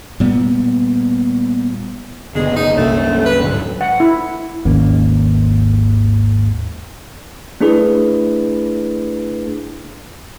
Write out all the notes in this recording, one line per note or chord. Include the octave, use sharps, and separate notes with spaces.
A#2 G3 B3
F#1 B2 D3 G#3
D#4
C2 F#2 A3 A#3
B4
D1 G#2 D3 F#3
F#5
E4
G#1 D#2 A#3 C#4
A3 D4 E4 G#4 B4